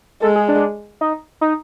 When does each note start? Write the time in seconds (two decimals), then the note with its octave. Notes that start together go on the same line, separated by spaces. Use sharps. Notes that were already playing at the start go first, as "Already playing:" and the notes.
0.22 G#3 A4
0.36 G#4
0.48 D4
1.01 D#4
1.41 D#4